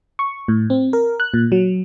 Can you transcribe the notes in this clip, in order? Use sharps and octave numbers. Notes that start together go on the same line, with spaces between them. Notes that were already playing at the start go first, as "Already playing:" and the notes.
C#6
A2
C4
A#4
F#6
A#2
F#3